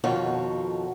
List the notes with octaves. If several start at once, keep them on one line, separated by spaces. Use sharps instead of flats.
F2 B2 D#3 F4 F#4 C#5